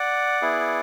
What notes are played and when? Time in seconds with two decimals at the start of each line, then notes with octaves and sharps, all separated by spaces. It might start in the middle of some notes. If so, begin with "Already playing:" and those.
Already playing: D5 F#5
0.42 B3 E4 G#4